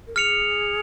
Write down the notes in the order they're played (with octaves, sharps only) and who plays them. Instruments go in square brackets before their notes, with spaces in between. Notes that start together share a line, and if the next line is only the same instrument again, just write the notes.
[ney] A#4
[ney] G#4 [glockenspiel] F6 C#7 F7